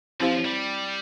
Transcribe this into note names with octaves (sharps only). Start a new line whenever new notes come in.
F3 C4 E4 G4 C5 F5
G3